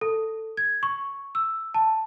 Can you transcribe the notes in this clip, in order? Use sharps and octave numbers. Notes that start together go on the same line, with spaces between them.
A4
G#6
C#6
E6
A5